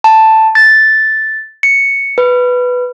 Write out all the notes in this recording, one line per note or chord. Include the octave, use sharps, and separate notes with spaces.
A5
A6
C#7
B4